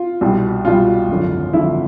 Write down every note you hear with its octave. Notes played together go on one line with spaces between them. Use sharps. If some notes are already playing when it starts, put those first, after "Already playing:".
Already playing: F4
C2 B2 G3
C2 B2 G3 F4
G#1 F#2 D3 F3
G#1 F#2 D3 F3 E4